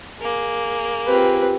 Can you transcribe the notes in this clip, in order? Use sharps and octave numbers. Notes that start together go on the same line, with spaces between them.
A#3 G#4
C4 F4 G4 B4